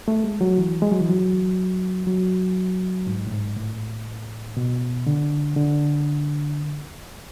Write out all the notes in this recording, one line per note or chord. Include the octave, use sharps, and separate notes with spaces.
A3
G#3
F#3
E3
G#3
F#3
E3
F#3
F#3
G#2
A2
G#2
A2
B2
D3
D3